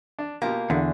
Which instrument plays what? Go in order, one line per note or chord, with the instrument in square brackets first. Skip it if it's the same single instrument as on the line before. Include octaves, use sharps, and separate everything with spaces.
[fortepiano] D4
[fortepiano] B2 F4 G4 [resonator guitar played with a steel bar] A#3
[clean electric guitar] E2 [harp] D3 [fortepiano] F#4 G#4